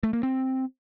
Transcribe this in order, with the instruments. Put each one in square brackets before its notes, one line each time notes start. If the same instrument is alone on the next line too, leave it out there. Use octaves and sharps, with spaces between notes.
[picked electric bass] A3
A#3
C4